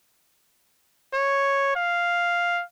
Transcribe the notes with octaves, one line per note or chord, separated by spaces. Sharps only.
C#5
F5